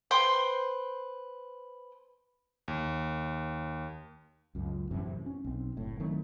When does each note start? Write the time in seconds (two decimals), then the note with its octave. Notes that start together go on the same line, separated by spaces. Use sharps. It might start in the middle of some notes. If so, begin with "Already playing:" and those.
0.11 B4 C5 G5 C6
2.68 D#2
4.55 C#2 F#2
4.91 A1 F#2 C3 E3
5.26 C#4
5.44 B1 C4
5.77 F#1 A2
6.00 D#3 F#3 A3 C4